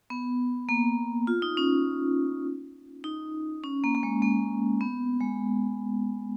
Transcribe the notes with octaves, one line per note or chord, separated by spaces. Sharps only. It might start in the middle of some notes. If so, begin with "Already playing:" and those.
B3
A#3
F4
D#4
C#4
D#4
C#4
A#3
A#3
G#3
A#3
B3
G#3